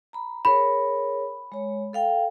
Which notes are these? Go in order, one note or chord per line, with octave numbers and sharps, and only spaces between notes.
A#5 B5
G#4 A#4 C#5 B5
G#3 C#5
A4 F5 G5